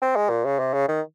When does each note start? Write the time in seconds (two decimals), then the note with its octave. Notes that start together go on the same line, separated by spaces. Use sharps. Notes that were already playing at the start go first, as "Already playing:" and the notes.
0.02 C4
0.16 G#3
0.30 A#2
0.45 C#3
0.59 C3
0.74 C#3
0.88 D#3